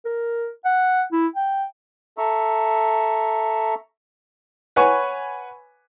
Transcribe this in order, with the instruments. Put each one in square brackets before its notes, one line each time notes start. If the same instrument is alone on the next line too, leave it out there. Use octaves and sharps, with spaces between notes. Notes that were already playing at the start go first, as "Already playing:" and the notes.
[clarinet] A#4
F#5
E4
G5
[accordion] A4 E5 A#5 C#6 E6
[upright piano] B4 C#5 F#5 G#5 B5 C#6